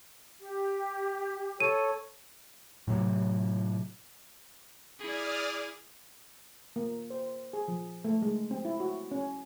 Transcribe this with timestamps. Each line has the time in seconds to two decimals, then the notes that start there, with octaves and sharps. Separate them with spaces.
0.42 G4
1.60 A4 C#5 D#7
2.87 A2 C3 F#3
4.99 E4 G#4 D5 D#6 F6
6.76 A#3
7.10 C5
7.53 G#4
7.68 F3
8.05 A3
8.22 G#3
8.51 C4
8.65 E4
8.80 F#4
9.11 C#4